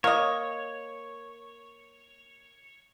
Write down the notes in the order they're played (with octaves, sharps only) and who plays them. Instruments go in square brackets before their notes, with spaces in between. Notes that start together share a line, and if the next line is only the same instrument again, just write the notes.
[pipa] A#3 D#5 [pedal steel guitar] C#5